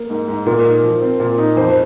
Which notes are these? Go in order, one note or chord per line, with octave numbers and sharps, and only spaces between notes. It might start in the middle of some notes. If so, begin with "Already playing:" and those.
Already playing: A#3
G#2
G#2
A#2 A#4
D#4
F3
C4
A#2
D#4
F2 C5